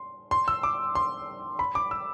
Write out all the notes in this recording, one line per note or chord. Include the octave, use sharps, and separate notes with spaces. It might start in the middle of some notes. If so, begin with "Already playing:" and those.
Already playing: C6
C6
E6
D6
C6
B5
D6
E6